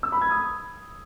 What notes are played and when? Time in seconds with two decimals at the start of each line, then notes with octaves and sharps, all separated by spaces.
0.03 E6
0.12 B5
0.21 G#6
0.31 D#6